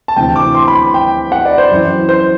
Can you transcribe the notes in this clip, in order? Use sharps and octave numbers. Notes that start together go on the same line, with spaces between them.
A5
D2 C3 E3 G5
D6
C6
B5
G5
F#5
D5
C5
F#2 E3
C5